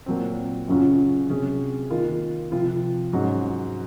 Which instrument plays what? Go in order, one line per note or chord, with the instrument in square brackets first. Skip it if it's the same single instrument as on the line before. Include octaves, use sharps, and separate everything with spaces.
[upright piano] A#2 F#3 C4
F#2 C#3 F#3 C#4 F4
C3 F#3 C#4 G#4
D#3 A#3 F4
C3 F3 C4 F4
G#2 F#3 C#4 F#4